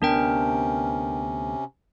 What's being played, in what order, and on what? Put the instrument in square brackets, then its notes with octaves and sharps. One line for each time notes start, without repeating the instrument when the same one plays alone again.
[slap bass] D2 B3 [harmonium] C3 C#4 [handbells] D4 A#4 G5